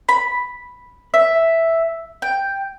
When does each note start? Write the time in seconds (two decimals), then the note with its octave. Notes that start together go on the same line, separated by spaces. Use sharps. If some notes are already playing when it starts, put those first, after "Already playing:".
0.09 B5
1.14 E5
2.22 G5